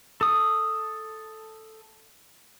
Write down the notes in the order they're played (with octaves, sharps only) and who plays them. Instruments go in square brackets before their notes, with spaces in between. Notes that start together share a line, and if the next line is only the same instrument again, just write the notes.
[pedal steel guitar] A4 D#6